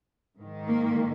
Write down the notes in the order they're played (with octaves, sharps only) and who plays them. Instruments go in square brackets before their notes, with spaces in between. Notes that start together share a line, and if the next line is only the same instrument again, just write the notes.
[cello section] G#2 D#3
A#3